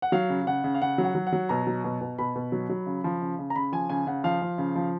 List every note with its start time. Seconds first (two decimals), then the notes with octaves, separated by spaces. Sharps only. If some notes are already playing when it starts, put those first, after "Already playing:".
0.02 F#5
0.12 F#3 F5
0.29 C#3
0.47 C#3 F#5
0.64 C#3
0.74 F5
0.81 C#3 F#5
0.98 F#3
1.04 F#5
1.15 F#3
1.27 F#5
1.32 F#3
1.49 B2 A#5
1.67 F#3
1.84 B2
2.01 B2
2.18 B2 B5
2.35 B2
2.52 F#3
2.69 F#3
2.86 C#3
3.04 F3
3.22 C#3
3.39 C#3
3.50 A#5
3.56 C#3 B5
3.72 F3 G#5
3.89 C#3 G#5
4.07 C#3 F#5
4.24 F3 F5
4.42 F3
4.58 C#3
4.76 F3